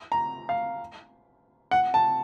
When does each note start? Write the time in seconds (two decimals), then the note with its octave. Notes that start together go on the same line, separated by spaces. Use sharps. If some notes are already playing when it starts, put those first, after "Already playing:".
0.12 A#5
0.49 F5
1.71 F#5
1.94 A5